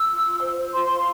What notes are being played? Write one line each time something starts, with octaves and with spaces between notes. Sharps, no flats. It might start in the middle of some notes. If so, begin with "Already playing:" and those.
Already playing: E6
F4
F4
C5
C5
F4 C6
F4